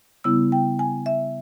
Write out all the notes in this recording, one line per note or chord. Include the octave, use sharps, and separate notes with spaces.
C#3 G3 B3 E4 E6
G5
G#5
E5